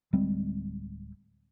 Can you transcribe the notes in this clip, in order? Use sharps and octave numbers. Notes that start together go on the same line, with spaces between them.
D1 G3 G#3 C4